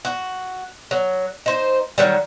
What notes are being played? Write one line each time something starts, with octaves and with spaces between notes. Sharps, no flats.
F#4
F#3
D#4 C5
D#3 F#3 G3